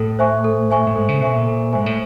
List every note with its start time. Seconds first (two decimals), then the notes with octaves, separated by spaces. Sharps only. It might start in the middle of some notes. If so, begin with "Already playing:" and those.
Already playing: A2 A4
0.19 C5 E5 G#5 C#6
0.44 A4
0.70 C5 E5 G#5 C#6
0.87 A2
0.95 G#2 A4
1.09 C#3
1.21 B2 C5 E5 G#5 C#6
1.34 A#2
1.47 A4
1.73 G#2 C5 E5 G#5 C#6
1.86 A2